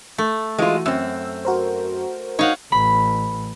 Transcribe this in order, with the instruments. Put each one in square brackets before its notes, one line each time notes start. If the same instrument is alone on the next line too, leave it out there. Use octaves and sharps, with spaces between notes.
[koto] A3
[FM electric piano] E3 F#4 [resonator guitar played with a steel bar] G#3 F4
[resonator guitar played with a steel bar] F#2 C4 [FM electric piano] E6
[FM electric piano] F#4 A#4 C5
[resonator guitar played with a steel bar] D#4 [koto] C#5 F5 F#5
[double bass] A1 [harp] B5